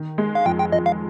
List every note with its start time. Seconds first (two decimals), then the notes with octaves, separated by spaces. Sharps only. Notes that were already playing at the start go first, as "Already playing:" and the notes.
Already playing: D#3
0.18 G#3
0.35 F5
0.46 F2 G5
0.59 G5
0.72 F2 D#5
0.86 F5